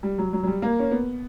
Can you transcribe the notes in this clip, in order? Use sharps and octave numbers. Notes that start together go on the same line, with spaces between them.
G3
F#3
F#3
F#3
G3
A#3
C#4
B3